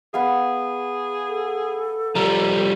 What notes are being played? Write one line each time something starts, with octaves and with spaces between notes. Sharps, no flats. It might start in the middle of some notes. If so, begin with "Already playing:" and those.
B3 G#4 F5
A4
F3 G3 A#4